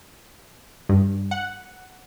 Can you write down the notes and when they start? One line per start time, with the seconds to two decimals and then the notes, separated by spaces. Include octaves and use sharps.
0.89 G2
1.31 F#5